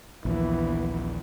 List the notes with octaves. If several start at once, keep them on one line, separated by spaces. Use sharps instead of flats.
A#1 D#2 E3 F3 B3